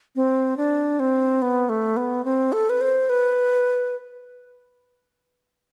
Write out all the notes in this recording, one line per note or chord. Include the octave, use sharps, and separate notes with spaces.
C4
D4
C4
B3
A3
B3
C4
A4
B4
C5
B4